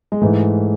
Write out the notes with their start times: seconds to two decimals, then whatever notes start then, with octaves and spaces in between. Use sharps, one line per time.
0.12 G#3
0.21 G#2 E3 A3